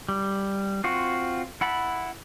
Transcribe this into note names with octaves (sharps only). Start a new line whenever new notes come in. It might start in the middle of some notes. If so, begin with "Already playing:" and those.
G3
C4 F4 F#4
E4 F#5 A5 B5